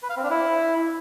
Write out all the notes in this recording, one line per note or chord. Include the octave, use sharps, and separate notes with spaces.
B4
F5
C4
D4
E4